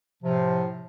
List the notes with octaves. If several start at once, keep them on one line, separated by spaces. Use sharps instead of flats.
A2 C3 F3